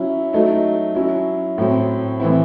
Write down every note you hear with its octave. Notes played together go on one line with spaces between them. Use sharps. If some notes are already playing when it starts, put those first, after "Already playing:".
Already playing: F#3 C#4 E4
F#3 A3 D#4
F#3 C#4 E4
A2 F#3 C4
A2 E3 C4 E4